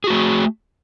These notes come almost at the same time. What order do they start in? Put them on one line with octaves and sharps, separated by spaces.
G#4 F#4 A3